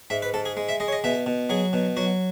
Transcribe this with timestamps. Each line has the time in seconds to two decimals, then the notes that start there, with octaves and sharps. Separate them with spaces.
0.10 G#2 E5
0.22 B4
0.34 G#2 A4
0.45 G#4
0.57 G#3
0.69 E5
0.80 G#3 D#5
0.88 C#5
0.92 D#5
1.04 B2 E5
1.26 B2
1.49 F#3 G#4
1.73 B2
1.97 F#3 F#4